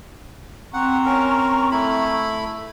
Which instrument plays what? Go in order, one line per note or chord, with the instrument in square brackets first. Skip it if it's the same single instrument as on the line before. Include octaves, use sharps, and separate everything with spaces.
[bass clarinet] C4 [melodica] F#5 [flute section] A#5 C#6
[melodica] C#4 A#4
A3 E4 B5